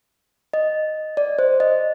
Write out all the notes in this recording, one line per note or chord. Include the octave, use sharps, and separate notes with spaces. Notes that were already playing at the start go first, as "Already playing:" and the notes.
D#5
D5
C5
D#5